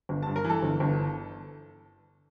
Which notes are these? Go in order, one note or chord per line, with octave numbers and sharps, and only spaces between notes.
G1
G2 A5
A#4
E3 A4
G1
G1